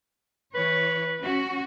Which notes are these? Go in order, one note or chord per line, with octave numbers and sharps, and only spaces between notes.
E3 B4 C#5
C#4 F#4